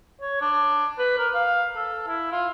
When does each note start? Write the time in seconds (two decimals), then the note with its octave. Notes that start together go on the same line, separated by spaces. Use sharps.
0.21 C#5
0.41 D4
0.99 B4
1.18 A#4
1.34 F5
1.76 A4
2.07 E4
2.32 F4